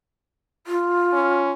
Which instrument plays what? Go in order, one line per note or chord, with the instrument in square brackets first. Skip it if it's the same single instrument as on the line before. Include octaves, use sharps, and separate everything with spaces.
[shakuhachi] F4
[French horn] C#4